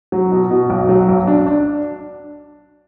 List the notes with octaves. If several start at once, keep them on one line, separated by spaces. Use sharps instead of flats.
F#3
B2
B2
B1
F#3
B1
D4
D4